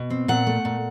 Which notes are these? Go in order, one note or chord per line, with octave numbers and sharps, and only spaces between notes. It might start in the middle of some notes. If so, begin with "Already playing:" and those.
Already playing: B2
C4
A#2 F#5
A3
A#2